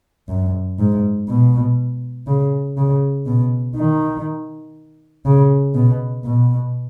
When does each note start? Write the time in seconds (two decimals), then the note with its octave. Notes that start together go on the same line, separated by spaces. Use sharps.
0.29 F#2
0.79 G#2
1.29 B2
2.27 C#3
2.77 C#3
3.26 B2
3.76 D#3
5.25 C#3
5.74 B2
6.25 B2